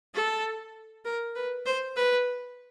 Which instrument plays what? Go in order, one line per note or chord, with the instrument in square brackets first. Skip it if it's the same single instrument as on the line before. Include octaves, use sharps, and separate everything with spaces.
[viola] A4
A#4
B4
C5
B4